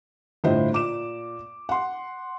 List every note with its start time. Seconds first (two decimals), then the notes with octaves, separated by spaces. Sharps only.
0.44 G1 A2 E4 F4 C5 D#5
0.73 A#2 D6 E7
1.69 F#5 C6